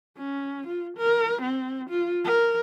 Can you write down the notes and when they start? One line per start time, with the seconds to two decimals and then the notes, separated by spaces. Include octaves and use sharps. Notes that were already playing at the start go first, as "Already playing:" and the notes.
0.18 C#4
0.67 F4
0.98 A#4
1.42 C4
1.90 F4
2.25 A#4